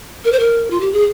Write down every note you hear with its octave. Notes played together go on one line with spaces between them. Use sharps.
A#4
C5
A#4
F4
G4
G#4